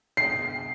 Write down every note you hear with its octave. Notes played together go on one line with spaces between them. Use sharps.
C7